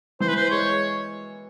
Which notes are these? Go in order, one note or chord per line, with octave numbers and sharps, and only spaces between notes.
E3 C5
B4
C5
G#3 C#5